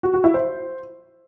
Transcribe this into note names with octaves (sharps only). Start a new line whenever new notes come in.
F#4
F#4
E4
C5